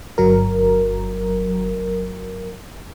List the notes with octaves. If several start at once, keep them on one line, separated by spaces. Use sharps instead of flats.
G1 F#3 A#4